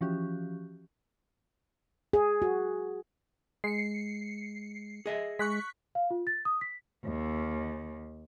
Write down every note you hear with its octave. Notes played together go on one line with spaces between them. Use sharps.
E3 F3 C#4 F#4 G4
G#4
F#4
G#3 C7 C#7
G#4 D#5 E5
G#3 C#6 F#6 B6
F5
F4
A6
D#6
B6
D#2